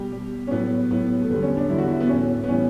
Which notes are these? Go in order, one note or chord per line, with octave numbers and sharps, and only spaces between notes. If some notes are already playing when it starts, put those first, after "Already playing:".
Already playing: B2 G3 G4
B2 G3
C#4
A2 F#3 B3
A2 F#3 B3
A3
E2 D3 G3 B3
C#4
D4
E2 D3 G3 E4
F#4
E4
B3
A2 E3 G3 C#4
B3
A2 E3 G3 C#4